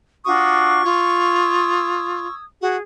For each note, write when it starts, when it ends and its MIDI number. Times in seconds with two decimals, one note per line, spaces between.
0.25 0.84 62
0.25 0.84 65
0.25 0.84 66
0.25 2.34 85
0.25 0.74 87
0.85 2.27 65
0.85 2.40 87
0.85 2.40 88
0.85 2.40 92
2.62 2.77 66
2.62 2.82 68